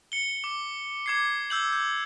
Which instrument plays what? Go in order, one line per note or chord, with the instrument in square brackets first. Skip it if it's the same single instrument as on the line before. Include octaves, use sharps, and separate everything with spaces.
[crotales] C#7 G7
D6
D6 G#6 C7
E6 G6 F#7
G6